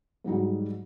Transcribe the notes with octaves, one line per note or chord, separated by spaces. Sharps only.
G#2 F#3 G3 D#4